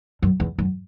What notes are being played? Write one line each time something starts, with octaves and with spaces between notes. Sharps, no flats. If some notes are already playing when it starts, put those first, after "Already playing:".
F#2
E2
F#2